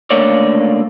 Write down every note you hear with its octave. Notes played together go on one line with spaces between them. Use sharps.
C#2 D3 A3 A#3 C#5 D5